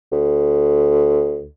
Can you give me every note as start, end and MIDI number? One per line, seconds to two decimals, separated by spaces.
0.12 1.47 38